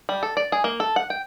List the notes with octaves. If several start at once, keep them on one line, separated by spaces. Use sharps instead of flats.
G3
A4
D5
G#4
A#3
A4
F#5
G5